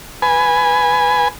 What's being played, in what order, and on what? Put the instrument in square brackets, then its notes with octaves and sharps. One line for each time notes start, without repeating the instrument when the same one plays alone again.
[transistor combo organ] B4 G#5